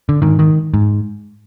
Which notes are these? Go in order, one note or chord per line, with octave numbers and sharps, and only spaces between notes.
D3
G#2 D#3
D#3
G#2